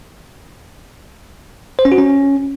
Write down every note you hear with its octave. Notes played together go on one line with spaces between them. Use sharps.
C5
C#4
F#4
C#4